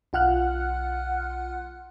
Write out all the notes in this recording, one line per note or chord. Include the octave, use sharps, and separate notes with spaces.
B1 F4 F#5 F6 F#6